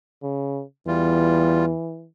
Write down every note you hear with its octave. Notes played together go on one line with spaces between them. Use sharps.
C#3
E2 E3 G3 F4